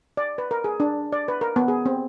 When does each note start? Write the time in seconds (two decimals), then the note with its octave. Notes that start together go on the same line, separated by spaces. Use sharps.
0.17 D5
0.38 B4
0.51 A#4
0.64 G#4
0.80 D4
1.12 D5
1.28 B4
1.41 A#4
1.56 B3
1.68 G#4
1.86 C4